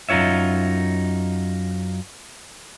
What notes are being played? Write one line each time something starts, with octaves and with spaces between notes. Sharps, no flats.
F#2 D#4 F4 C#5 E5